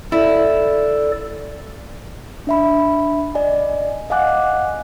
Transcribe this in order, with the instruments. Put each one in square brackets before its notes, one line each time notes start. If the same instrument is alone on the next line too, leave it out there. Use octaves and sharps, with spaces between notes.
[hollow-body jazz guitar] E4 [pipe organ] A4 D5
[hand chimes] D4 E5 B5
D5 D#5 G#5
D#5 F5 F#5 G#5 D6 F#6